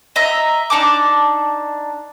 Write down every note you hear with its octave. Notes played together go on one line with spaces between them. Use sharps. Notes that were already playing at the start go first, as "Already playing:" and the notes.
D#5 E5 A#5
D4 D#4 A5 D6